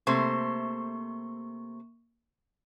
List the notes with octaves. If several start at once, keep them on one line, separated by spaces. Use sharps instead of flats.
C3 A3 A#3 C5 C#6